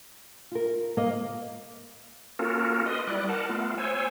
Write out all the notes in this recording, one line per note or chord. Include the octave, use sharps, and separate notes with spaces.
F4 A#4
A#3 D#5
A#3 C#4 F4 F#4 A4 A#4
B4 D#5 C6 D#6
G3 E4 D5 F#6
A#4 F#5 A5
A3 B3 F4
C5 C#5 G#5 E6